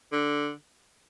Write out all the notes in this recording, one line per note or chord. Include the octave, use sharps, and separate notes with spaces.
D3